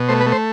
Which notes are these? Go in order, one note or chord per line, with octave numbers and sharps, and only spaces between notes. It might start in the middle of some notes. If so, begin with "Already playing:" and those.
Already playing: B2
A3 C5
B4
A3
C5